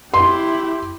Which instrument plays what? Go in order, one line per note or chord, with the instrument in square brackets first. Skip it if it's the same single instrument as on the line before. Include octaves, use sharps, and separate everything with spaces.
[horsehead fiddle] E4 G4 [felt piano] C6